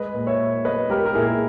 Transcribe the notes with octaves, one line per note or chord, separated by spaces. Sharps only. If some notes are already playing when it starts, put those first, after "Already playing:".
Already playing: G#3 B4 D#5
A#2
C#5 E5
A#2
B3 B4 D#5
G#3 G4 A#4
A#4
A#2 E4 G#4